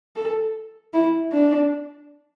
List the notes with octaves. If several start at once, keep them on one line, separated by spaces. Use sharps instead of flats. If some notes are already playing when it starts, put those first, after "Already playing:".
A4
E4
D4